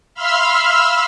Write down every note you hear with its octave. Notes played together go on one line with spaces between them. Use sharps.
E5 F5 B5 C6 E6 F6